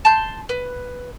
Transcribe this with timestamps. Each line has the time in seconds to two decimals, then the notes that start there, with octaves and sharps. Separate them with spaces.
0.05 A5 C6 G6
0.49 B4